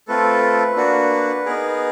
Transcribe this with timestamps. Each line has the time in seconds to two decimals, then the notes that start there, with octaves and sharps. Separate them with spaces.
0.08 A3 C4 F4 A4 B4
0.76 A#3 D4 F#4
1.46 B3 D#4 G#4 A#4